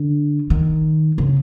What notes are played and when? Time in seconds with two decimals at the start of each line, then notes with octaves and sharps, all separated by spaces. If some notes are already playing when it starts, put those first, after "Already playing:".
Already playing: D3
0.50 D#3
1.18 C#3